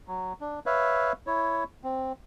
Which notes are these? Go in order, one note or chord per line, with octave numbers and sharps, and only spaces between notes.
F#3
D4
B4 C#5 E5 F5
E4 C#5
C4